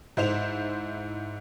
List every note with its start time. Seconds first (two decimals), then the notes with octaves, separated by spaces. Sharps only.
0.17 G#2 E4 C5 F7